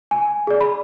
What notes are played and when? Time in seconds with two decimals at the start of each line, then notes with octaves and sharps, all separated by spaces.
0.11 G#5
0.47 G#4 D5
0.61 B5